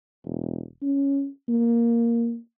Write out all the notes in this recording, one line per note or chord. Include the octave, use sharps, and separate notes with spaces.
E1
C#4
A#3